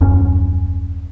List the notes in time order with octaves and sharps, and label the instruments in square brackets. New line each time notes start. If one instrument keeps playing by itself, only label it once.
[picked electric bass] D#1 F#2 C#4